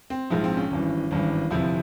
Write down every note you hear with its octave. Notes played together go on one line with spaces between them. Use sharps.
C4
A#1 G#2 F3 E4
C4
C#4
G#1 G2 E3
G#1 G2 E3
G1 F2 C3 F3 E4